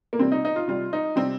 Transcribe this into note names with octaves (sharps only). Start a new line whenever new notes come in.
A#3
C3 G3 C4
D#4
D#4
F4
C3 G3 F4
D#4
C3 G3 C4